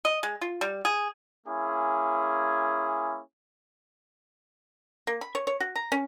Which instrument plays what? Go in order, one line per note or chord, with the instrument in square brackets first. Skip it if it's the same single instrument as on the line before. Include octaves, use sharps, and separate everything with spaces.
[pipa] D#5
G#3
F4
G3
G#4
[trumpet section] A#3 C#4 E4 G#4
[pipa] A#3
B5
C#5
C#5
F#4
A#5
C#4